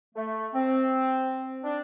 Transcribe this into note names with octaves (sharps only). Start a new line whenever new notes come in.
A3
C4
D4